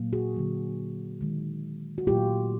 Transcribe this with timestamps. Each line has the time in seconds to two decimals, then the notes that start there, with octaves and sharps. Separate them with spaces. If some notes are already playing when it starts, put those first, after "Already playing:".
Already playing: A#2 F#3 A#3
0.13 F#4 G#4
0.34 D3 F#3 A#3
1.21 D#3 G#3
1.98 F#4
2.07 A#2 F#3 A3 F4 G4